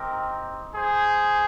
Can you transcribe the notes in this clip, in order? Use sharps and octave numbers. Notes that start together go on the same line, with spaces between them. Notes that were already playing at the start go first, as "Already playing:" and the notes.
Already playing: C4 D#4 G4 A#4
G#4 C5